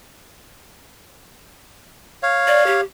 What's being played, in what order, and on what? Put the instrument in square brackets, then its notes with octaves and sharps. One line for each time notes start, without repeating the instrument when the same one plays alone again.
[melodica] C#5 F5
[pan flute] D5
G4